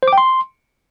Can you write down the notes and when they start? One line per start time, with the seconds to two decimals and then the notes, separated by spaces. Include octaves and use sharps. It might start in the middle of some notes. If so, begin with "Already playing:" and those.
0.03 C5
0.08 D6
0.13 G5
0.18 C6